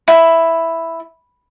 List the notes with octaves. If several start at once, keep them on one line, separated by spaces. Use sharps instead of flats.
E4